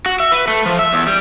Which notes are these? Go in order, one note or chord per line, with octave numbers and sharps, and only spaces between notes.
F#4
E5
B4
A3
F3
E5
E2
G3